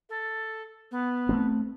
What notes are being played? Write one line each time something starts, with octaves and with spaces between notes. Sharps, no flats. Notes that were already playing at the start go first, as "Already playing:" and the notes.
A4
B3
A3 A#3 C4